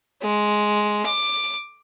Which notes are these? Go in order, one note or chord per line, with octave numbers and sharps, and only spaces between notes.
G#3
D6